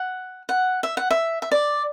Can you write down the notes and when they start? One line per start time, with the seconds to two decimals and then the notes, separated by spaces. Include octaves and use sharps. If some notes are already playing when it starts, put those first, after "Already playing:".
Already playing: F#5
0.49 F#5
0.83 E5
0.97 F#5
1.11 E5
1.42 E5
1.52 D5